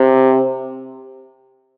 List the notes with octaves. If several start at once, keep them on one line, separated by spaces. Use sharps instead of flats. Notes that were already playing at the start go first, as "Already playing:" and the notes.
Already playing: C3